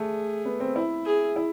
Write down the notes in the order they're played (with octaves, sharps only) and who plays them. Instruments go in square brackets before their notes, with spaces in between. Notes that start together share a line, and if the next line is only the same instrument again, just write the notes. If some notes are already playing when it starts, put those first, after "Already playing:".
Already playing: [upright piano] A3 [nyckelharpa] G#4
[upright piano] B3
C4
E4
[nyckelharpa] G#4
[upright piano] E4